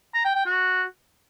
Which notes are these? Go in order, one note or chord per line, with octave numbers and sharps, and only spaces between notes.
A#5
G5
G5
F#4